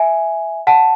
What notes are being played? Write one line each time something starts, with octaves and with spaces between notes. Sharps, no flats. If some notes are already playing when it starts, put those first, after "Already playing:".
Already playing: E5 G#5
F#5 A5